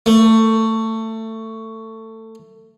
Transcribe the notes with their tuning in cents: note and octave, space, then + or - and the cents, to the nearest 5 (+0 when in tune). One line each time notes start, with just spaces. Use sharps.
A3 +20